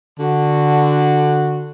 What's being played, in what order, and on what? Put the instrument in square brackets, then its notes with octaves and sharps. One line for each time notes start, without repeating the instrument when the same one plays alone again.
[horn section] D3 F#4